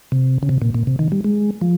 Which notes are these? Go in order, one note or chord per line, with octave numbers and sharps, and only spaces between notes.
C3
C#3
C3
A#2
A#2
C3
D#3
G3
G#3
F3